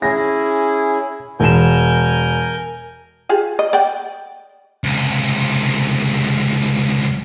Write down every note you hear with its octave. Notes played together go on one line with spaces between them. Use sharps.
C#4 E4 G#4 A#6
E1 A#4 G#5 G6 E7
F4 G4 G#4
D#5
D5 F#5 G5
C#2 C3